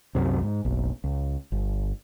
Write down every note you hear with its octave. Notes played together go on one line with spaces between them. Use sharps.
C2 F#2 C3
G#2
F#1 B1
C#2
G1